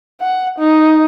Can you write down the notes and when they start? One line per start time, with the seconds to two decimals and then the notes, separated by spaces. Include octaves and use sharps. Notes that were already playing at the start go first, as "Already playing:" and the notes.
0.21 F#5
0.59 D#4